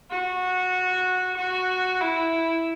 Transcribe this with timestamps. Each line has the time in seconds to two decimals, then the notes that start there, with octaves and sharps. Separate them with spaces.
0.11 F#4
1.37 F#4
2.01 E4